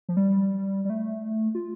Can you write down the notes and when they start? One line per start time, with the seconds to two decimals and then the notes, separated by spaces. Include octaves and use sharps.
0.09 F3
0.17 G3
0.85 G3
0.90 A3
1.55 F4